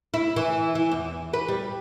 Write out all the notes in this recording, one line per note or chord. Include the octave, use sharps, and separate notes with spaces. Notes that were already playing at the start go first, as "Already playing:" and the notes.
E4
E3
E3
E2
B4
G3